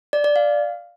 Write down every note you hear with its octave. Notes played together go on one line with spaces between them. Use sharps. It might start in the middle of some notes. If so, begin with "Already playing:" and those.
D5
D5
F5